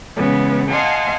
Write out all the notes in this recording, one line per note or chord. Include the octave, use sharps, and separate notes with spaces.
C#3 E3 G#3 B3
D#5 F5 F#5 G#5 A5 C6